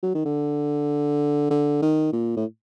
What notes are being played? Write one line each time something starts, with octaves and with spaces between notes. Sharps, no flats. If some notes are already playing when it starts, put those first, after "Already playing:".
F#3
D#3
D3
D3
D#3
A#2
A2